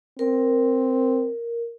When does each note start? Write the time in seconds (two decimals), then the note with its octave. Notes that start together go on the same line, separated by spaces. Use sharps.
0.19 C4 A#4